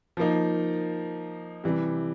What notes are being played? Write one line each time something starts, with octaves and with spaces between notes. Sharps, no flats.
F3 A#3 D#4
C3 E3 G3